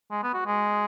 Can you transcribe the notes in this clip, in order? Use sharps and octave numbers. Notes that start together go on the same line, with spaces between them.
G#3
B3
F#4
G#3